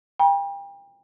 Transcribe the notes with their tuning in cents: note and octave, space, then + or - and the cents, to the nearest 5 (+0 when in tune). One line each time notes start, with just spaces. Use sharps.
G5 +30 B5 -45